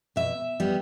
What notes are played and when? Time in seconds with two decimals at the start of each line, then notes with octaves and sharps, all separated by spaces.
0.16 B2 E5
0.60 G3 B3